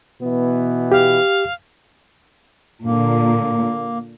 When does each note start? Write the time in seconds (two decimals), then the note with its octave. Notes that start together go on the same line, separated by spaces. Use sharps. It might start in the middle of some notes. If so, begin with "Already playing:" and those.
0.21 B2 E3 B3
0.92 G4 F5
2.85 A#2 D3 A#3